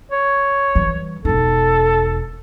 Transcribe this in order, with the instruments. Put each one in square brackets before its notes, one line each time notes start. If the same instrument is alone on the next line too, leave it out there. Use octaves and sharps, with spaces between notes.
[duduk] C#5
[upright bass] E3 G3
[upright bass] E1 D#4 [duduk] A4